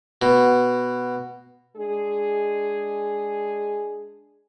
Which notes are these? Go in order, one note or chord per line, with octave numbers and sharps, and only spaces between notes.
B2
G#3 D4 G#4